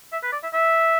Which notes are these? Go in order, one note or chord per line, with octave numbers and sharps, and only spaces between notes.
E5
B4
D5
E5
E5